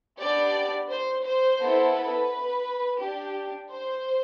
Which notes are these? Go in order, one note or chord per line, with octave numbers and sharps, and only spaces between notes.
B3 D4 G4 D5
C5
C5
B3 E4 A4
B4
D4 G4
C5